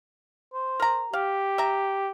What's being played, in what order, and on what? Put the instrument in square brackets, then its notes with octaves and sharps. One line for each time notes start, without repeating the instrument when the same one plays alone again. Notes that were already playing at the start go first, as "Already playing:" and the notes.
[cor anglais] C5
[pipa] A#4 A#5
[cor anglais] G4 [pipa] F5
[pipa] E5 A#5